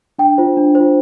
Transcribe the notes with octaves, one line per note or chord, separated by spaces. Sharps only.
D4 G5
F4 C5
D4
F4 C5